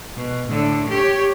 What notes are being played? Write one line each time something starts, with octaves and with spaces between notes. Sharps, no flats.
B2
A2 D3
G4 C#5